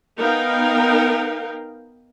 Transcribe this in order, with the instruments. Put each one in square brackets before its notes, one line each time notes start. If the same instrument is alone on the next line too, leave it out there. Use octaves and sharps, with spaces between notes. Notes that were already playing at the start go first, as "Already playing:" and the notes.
[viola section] B3 D#4 A#4 F5 G5